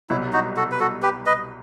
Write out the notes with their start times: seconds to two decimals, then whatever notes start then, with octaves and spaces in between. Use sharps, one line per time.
0.10 C2 B2 F#3 E4
0.33 D#4 F#4
0.56 F#4 A4
0.72 B4
0.80 F#4 A4
1.02 G4 B4
1.26 B4 D#5